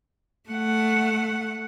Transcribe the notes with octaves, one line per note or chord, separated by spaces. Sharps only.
A3 F#5